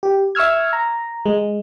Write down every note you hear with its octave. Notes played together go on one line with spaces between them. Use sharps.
G4
E5 C#6 E6 F6 G#6
A#5
G#3